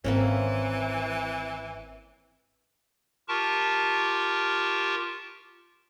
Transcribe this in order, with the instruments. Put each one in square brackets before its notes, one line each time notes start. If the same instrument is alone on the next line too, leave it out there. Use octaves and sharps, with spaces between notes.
[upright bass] G#1 [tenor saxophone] E3 [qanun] A#3 C4 C#4
[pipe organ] F4 G4 A#4 A5 C#6